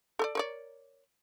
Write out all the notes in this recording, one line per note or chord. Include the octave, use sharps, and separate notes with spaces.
A4 A#4 D5
A#4 C#5 D5